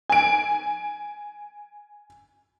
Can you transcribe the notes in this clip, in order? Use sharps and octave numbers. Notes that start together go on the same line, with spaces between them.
G#5 D7